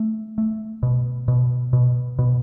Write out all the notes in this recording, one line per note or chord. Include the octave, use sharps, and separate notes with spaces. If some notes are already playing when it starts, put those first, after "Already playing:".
Already playing: A3
A3
B2
B2
B2
B2